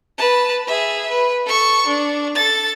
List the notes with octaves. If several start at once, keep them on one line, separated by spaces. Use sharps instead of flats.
B4 A5
G#4 E5
B4
A4 C#6
D4
A4 A6